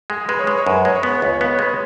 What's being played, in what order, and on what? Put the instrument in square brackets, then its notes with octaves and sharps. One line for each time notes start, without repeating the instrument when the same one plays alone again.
[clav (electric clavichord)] G#3 [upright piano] G#4
[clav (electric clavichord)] G#3 [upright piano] B4
[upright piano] C#5
[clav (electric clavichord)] G#3 [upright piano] B4
[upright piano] C#5
[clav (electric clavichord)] F#2 [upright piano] B4
[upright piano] C#5
[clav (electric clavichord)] G#3 [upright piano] B4
[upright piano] C#5
[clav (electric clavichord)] B3 [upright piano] B4
[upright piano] C#5
[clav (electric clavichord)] C#2 [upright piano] B4
[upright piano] C#5
[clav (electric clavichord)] B3 [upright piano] B4
[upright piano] C#5
[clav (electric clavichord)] G#3 [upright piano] B4